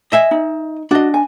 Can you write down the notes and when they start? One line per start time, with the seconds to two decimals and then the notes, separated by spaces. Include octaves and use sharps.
0.12 D#5 E5 G#5
0.31 D#4
0.91 D4 F#4 D#5
1.14 G#5